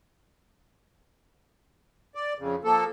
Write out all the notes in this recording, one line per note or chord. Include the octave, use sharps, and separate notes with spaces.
D5
F2 C#3
F3 A#3 A4